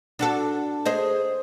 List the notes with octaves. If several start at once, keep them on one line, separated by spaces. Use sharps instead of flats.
D4 F#4 A4
G#4 C5 D#5